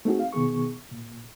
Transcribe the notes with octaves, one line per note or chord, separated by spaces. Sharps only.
A3 C4 D#4 F#4 G#4
F5
B2 D#3 B3 G#4 C#6
A#2